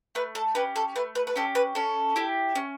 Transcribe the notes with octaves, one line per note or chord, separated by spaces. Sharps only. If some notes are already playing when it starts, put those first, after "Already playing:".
A3 B4
A4
C#4 G4 B4
A4
A3 B4
B4
B4
C#4 G4 A4
B4
C#4 A4
E4 G4
C#4